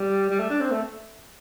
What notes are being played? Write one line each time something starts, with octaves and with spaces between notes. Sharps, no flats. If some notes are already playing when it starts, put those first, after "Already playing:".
Already playing: G3
G3
A3
D4
C4
A3